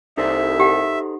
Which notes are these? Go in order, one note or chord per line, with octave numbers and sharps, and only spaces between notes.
C2 D#4 A4 C5 E5
G4 F#5